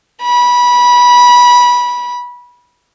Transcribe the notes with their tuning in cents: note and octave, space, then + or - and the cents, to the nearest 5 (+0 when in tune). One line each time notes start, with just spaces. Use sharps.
B5 -20